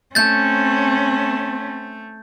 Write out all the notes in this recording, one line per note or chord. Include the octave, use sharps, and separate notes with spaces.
A3 C4 C#4 G6 A6